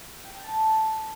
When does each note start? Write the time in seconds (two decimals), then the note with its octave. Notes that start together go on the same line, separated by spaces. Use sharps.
0.25 G5
0.34 A#5
0.43 A5